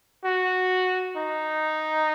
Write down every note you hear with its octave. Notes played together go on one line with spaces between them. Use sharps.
F#4
D#4